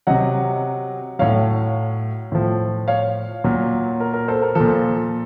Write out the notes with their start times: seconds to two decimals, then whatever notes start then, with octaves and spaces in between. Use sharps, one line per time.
0.07 C3 F#3 D#5 F#5
1.19 A2 F#3 C#5 F5
2.32 A2 F3
2.88 C#5 F5
3.44 A#2 F#3
4.00 A#4
4.13 A#4
4.28 A4 C5
4.42 A#4
4.55 A#2 F3 A4 C5